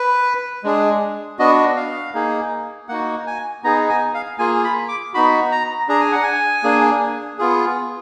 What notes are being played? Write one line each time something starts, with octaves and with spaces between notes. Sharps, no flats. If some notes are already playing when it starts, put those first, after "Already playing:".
Already playing: B4
G#3 D4 G#4
B3 D4 F#4 D#5
F5
A#3 D#4 G#4
A#3 D#4 F#4 F#5
G#5
B3 D#4 G#4 A#5
G#5
F5
A#3 F4 G#4 G#5
B5
D6
B3 D#4 F#4 B5
A#5
D4 G#4 A#5
G#5
F#5
G#5
A#3 D4 G#4
B3 F4 G#4